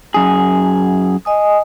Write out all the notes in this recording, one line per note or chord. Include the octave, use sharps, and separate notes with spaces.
F#2 G#4
D#5 G#5 D#6